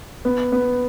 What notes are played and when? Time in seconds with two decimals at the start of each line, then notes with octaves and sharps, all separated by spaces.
0.25 B3
0.52 B3